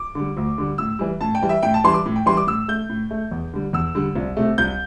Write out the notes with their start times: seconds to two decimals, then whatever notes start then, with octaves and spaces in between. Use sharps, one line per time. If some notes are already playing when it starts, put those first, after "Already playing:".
Already playing: D6
0.15 D3 G3
0.37 D2
0.58 D3 G3
0.78 A2 E6
0.99 E3 G3
1.21 A2 A5
1.35 G5
1.42 E3 G3
1.49 E5
1.63 A2 G5
1.74 A5
1.84 E3 G3 C6
1.94 D6
2.06 A2
2.16 G5
2.26 E3 G3 C6
2.37 D6
2.47 A2 E6
2.68 A3 G6
2.89 A2
3.11 A3
3.32 E2
3.53 D3 G3
3.73 E2 E6
3.95 D3 G3
4.15 C2
4.37 C3 A3
4.58 C2 G6